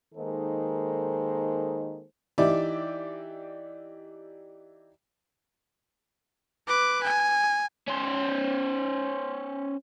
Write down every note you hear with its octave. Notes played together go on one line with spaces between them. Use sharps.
D#3 G#3 A#3 D#4 A4 C5
E3 D#4 G4 D5 E5 D6
B4 D6
G#5
C#4 C5